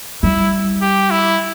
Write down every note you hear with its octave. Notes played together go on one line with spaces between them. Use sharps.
G3 E4
G4
E4